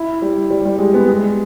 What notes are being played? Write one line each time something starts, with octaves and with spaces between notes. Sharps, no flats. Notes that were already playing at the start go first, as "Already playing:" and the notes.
Already playing: E4
G3
G3
G3
G#3
B3
G#3